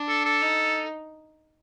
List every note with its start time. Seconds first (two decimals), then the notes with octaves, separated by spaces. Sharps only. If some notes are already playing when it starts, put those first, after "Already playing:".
Already playing: D4
0.09 A4
0.25 A4
0.42 D#4